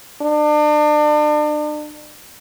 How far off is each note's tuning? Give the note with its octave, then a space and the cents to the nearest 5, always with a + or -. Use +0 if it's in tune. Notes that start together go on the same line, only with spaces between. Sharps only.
D4 +40